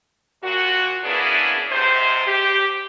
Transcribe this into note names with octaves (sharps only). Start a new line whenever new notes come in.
A#2 F#4
A#3 B3 C#4 D4 E4 G#4
G#2 C3 C5
G4